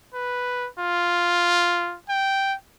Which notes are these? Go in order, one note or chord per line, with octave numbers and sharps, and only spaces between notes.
B4
F4
G5